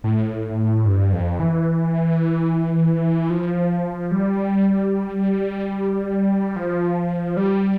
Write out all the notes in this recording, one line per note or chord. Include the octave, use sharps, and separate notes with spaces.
A2
G2
F2
E3
F3
G3
F3
G3